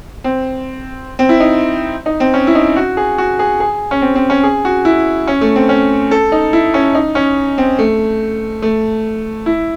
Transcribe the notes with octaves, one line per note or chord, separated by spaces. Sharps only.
C4
C4
E4
D#4
D#4
C4
C#4
E4
D#4
F#4
G#4
F#4
G#4
G#4
C#4
C4
C4
C#4
G#4
F#4
E4
C#4
A3
C4
C#4
A4
D#4
E4
C#4
D#4
C#4
C4
A3
A3
E4